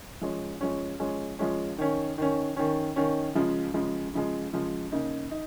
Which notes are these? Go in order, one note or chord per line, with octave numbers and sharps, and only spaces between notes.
F3 G#3 C#4
F3 G#3 C#4
F3 G#3 C#4
F3 G#3 C#4
D#3 C#4
D#3 C#4
D#3 C#4
D#3 C#4
C#3 F3 G#3
C#3 F3 G#3
C#3 F3 G#3
C#3 F3 G#3
C#3 A#3 D#4
D#4